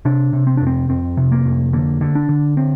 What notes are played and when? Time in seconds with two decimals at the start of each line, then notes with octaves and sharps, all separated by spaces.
0.05 C3 D4
0.33 C3
0.47 C4
0.57 D4
0.61 F2
0.67 C4
0.89 F2 C4
1.17 C3
1.32 A#3
1.45 F2
1.73 D3 A#3
2.01 D3
2.15 D4
2.29 D3
2.57 C4